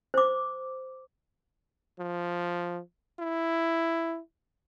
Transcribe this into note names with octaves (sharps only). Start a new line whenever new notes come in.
C5 D6
F3
E4